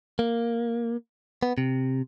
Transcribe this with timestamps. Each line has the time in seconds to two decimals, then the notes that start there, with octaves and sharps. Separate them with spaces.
0.19 A#3
1.43 B3
1.58 C3